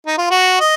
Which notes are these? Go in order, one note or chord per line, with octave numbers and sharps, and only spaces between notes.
D#4
F4
F#4
D#5